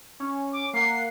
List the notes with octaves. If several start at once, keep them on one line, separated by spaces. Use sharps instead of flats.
C#4
D6
A#3 F#5 C7